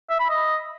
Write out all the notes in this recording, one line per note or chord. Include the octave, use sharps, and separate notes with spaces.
E5
B5
D#5